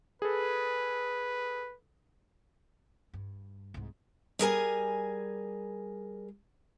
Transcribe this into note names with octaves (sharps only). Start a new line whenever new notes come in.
G#4 A4 B4
G2
C2 G#2
G3 G#4 A#4 G#5